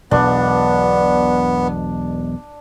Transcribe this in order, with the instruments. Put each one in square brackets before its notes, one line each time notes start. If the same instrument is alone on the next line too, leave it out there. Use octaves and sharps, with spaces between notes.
[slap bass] E1 B1 B2 [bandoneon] B3 [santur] D4